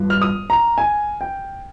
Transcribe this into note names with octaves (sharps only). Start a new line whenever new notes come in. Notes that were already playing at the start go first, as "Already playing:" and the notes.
Already playing: G1 G2 F3
F6
D#6
A#5
G#5
G5